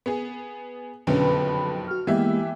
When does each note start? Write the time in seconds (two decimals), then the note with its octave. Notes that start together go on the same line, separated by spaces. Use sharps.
0.06 B3 G#4
1.07 F#1 B1 F2 D3 B3 C#4 B4
1.87 F#4 C#6 F6
2.07 E3 G#3 A#3 B3 E4 G4 E5 G#5